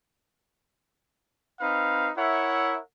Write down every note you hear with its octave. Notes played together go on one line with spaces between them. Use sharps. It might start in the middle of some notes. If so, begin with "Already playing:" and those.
C4 D#4 B4 F5 B5
E4 A#4 C#5 E5 F#5